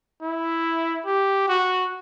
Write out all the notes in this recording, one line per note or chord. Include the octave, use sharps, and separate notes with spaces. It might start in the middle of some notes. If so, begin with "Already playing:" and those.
E4
G4
F#4